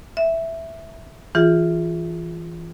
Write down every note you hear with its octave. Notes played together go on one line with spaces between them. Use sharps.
E5
E3 F4 G#4